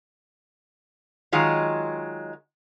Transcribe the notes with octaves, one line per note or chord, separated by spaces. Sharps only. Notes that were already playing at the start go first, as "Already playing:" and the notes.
D#3 F#3 G#3 F4